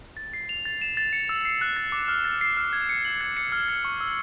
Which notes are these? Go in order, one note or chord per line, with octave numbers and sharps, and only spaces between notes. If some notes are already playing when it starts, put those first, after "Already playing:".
A6
C7
F7
A6
E7
A6
C#7
E6
C7
F#6
A6
D6
F6
A6
C7
F6
G#6
C#7
F#7
G#6
C#7
F6
G#6
C#6
E6